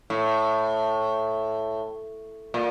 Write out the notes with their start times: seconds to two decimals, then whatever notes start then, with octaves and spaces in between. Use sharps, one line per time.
0.10 A2
2.54 A#2